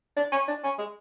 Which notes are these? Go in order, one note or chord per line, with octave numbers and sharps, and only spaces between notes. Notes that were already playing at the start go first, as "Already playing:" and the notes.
D4
C#4
D4
C#4
G#3